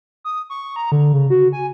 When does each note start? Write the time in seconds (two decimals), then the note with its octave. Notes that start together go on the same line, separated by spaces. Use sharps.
0.24 D#6
0.50 C#6
0.76 A#5
0.92 D3
1.13 C#3
1.30 F#4
1.53 G#5